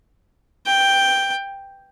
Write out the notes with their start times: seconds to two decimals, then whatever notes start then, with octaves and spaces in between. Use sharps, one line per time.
0.66 G5